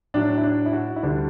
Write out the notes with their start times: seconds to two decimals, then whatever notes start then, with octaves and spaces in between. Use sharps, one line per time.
0.14 A2 F#3 D4
0.37 E4
0.43 D4
0.66 E4
0.73 F#4
0.96 E4
1.03 D2 D3 G3 D4